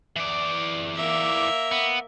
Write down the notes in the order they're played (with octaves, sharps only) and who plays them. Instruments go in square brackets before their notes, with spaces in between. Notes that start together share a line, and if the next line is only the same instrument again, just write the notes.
[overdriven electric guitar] E3 D5
[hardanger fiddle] A#3 E5
[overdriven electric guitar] B3